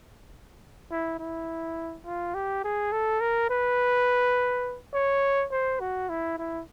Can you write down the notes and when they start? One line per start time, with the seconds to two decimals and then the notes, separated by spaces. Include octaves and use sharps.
0.91 E4
1.19 E4
2.06 F4
2.34 G4
2.64 G#4
2.92 A4
3.21 A#4
3.50 B4
4.93 C#5
5.51 C5
5.80 F#4
6.09 E4
6.38 E4